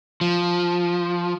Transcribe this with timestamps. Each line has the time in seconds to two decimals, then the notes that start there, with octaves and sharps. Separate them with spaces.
0.21 F3